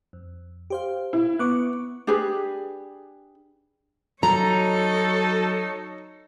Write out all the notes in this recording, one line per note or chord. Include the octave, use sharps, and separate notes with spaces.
F2
G4 C5 F5
E4
B3 C#6 D6 F#6
D4 G4 G#4 B4
F#3 D#4 A4 C#5 A#5